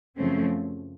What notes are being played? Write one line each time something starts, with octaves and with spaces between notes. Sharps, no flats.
F#2 C#3 F3 A3 C4 C#4